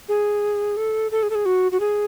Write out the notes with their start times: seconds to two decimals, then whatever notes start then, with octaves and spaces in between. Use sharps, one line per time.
0.09 G#4
0.77 A4
1.11 A4
1.23 G#4
1.30 A4
1.35 G#4
1.45 F#4
1.72 F#4
1.80 G#4